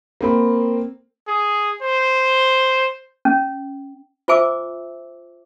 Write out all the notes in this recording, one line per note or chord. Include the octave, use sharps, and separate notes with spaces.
A#3 C4 B5
G#4
C5
C#4
F4 C5 E5 G#5 D6 E6